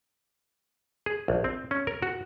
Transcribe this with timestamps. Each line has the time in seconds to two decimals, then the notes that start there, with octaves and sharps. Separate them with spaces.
1.06 G#4
1.28 A#1
1.44 C4
1.71 C#4
1.87 A#4
2.02 F#4